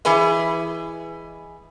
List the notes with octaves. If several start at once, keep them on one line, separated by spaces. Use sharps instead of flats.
E3 G#4 B4 D#5